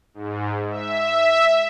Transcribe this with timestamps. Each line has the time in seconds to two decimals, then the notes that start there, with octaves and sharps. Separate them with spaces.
0.14 G#2
0.70 E5